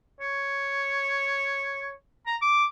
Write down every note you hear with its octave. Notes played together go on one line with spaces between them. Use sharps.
C#5
A#5
D6